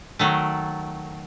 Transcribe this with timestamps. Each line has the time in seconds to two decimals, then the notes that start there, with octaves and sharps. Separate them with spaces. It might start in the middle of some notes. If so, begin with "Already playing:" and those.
0.19 D#3 F#3 A3